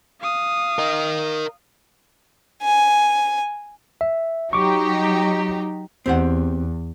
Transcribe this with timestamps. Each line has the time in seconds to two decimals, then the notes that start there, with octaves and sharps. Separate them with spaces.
0.21 F5 D#6
0.79 A#4 D#5
2.63 G#5
4.01 E5
4.53 F#3 D#4 G4 C#6 D6
6.06 E2 C4 G4 F#5